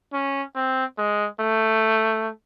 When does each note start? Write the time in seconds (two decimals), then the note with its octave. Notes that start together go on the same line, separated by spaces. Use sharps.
0.13 C#4
0.55 C4
0.98 G#3
1.40 A3